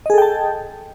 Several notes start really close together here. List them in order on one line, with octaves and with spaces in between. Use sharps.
D#5 G#4 A4 G5 A5